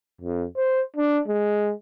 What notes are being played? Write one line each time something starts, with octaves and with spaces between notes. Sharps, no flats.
F2
C5
D4
G#3